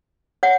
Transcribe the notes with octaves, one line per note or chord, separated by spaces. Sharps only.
C#5 F#5